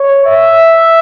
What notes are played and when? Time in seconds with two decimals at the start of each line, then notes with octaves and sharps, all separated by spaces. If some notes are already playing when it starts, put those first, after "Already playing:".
Already playing: C#5
0.25 E5